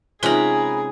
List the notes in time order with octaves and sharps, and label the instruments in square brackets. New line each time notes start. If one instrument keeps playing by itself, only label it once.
[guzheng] C3 G#3 C#4 [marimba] D#4 F4 [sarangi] G#4 [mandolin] A#4 B4